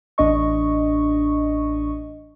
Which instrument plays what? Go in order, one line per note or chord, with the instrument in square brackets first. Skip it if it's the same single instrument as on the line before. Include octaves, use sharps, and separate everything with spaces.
[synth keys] A1 D4 D#5 C#6